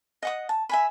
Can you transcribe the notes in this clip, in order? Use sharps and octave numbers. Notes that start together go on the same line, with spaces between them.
D#5 F#5 D#6
A5
E5 G#5 B5